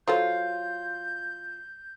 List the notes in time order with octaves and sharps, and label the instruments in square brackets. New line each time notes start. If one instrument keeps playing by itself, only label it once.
[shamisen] F#3 A4 C5 [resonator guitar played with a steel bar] F4 [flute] G6